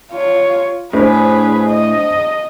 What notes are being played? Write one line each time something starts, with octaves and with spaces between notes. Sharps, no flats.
F4 C#5
A2 D4 G#4 B4 C5
D#5